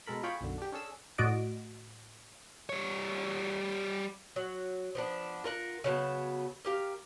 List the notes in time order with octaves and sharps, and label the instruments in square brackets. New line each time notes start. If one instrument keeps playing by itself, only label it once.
[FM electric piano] B2 G#3 A4 A#4 B5
F4 G#4 C#5 G5 B5 C#6
B1 F#2 D3
D4 G4
C#4 D4 G#4 A4 E6
[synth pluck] A2 F#4 D5 D#5 D7
[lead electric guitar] G3 C#5
[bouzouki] F#3
F3 B3 D4
F4 A#4 F#5
C#3 F#3 B3 A5
A#3 G4 F5